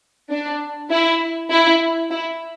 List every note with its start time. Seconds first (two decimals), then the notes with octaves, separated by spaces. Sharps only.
0.31 D4
0.91 E4
1.51 E4
2.11 E4